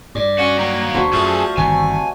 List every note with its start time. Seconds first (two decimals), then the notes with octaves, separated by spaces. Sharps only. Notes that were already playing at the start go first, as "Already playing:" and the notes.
0.15 G2 D5
0.39 C#4 F#4 F#5
0.58 F#3 A#3 G4
0.94 D2 B2 F#4 A4 C5
1.13 F#2 F3 A3 G#4 A4
1.57 G1 C3 D#3 E3 G#5